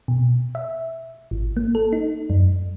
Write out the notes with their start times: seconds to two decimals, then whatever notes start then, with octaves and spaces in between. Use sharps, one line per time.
0.08 B2
0.55 E5
1.31 G#1
1.57 A#3
1.75 A4
1.93 D#4
2.30 F#2